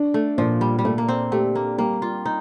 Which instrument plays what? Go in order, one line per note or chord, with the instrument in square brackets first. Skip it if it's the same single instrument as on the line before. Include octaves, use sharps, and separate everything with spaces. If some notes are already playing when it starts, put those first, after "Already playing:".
Already playing: [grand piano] D4
[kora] A3
[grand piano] A#2 [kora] F3
[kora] G3
G3
[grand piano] A#2 [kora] A3
[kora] A#3
C4
[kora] A3 [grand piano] G4
[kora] A#3
[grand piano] G3 [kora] A#3
[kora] F4
D#4